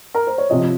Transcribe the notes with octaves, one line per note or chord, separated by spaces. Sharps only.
A#4
C5
C#5
C3 F3 D#5